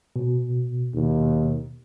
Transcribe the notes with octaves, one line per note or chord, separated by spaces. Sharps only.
B2
D#2